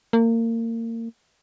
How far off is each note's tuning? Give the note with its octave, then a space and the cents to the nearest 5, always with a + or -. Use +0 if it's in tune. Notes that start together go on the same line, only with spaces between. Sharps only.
A#3 -30